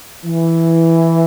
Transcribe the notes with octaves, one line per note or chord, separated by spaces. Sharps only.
E3